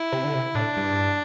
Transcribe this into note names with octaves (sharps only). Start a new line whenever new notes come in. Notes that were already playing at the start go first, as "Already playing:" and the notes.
Already playing: E4
C3
D3
C3
A2 D4
G2